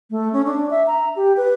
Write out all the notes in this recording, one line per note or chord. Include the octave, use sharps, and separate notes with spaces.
A3
C#4
D4
E5
A#5
G4
B4